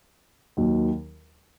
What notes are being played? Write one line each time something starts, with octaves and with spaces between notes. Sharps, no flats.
D#2 D#3 F#3